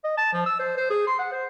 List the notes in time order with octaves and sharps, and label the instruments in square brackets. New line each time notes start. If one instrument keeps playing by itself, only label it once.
[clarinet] D#5
A5
F3
E6
C5
C5
G#4
C6
F#5
C5